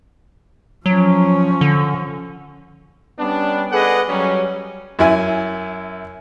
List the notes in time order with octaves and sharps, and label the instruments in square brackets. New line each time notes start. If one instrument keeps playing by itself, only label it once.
[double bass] F3 C#4 [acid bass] F#3
[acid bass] D3
[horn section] G3 B3 C#4 D4
G#4 A4 B4 D5 D#5 F#5
F#3 G3 C#4
[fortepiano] F#2 E4 G#5